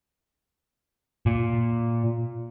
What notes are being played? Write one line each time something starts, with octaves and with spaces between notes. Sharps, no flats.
A#2